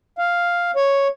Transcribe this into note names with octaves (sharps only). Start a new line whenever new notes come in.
F5
C#5